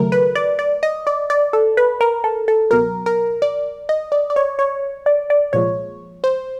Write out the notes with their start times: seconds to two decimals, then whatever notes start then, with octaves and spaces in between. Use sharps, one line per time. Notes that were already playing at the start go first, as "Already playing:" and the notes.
Already playing: D#2 C#3 F#3 A3 A#4
0.12 B4
0.35 D5
0.59 D5
0.83 D#5
1.07 D5
1.30 D5
1.53 A4
1.77 B4
2.01 A#4
2.24 A4
2.48 A4
2.71 C#2 B2 F#3 A#4
3.06 A#4
3.42 D5
3.89 D#5
4.12 D5
4.30 D5
4.36 C#5
4.59 C#5
5.06 D5
5.30 D5
5.53 C2 A#2 F3 G#3 C#5
6.24 C5